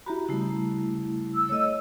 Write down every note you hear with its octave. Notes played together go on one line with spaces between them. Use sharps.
E4 F#4 G4 A#5 B5
C#3 G3 A3 E4
E6
D2 A3 C#5 D#5